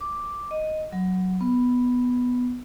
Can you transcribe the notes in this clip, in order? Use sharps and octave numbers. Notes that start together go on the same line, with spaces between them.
D6
D#5
F#3
B3